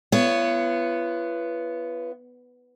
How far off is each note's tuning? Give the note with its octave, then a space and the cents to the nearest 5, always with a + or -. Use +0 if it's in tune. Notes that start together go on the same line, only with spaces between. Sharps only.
B3 +0 F4 -45 C#5 +0